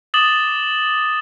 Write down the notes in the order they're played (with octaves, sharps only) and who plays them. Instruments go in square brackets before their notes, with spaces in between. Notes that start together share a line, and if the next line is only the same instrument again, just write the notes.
[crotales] D6 D#6 A6 E7 F#7 G7